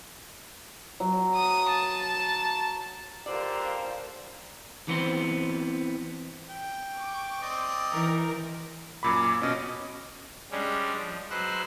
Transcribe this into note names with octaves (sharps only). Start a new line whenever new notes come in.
F#3
D#6
A5
D3 F4 G4 A#4 C5 D5
E3 B3 C4 C5
G5
C#6 D6
C4 D5 D#5
E3 D#4 A#4
F#2 A#2 B5 D6
B2 C#4 D#5
G3 G#3 C#4 D4
F3
F#3 G#3 B4 C5 E6 F#6